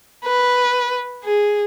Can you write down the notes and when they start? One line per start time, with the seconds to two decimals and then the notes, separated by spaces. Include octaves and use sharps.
0.25 B4
1.24 G#4